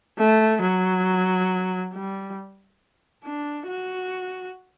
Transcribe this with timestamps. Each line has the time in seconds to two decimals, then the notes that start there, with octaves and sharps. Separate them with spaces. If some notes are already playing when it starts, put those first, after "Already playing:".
0.18 A3
0.62 F#3
1.94 G3
3.24 D4
3.68 F#4